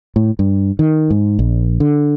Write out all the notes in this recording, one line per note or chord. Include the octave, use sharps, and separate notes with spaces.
A2
G2
D#3
G#2
A#1
D3